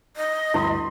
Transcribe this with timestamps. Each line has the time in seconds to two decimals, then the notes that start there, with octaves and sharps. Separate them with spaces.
0.17 D#5
0.54 D2 G2 E4 B5 C6 D#6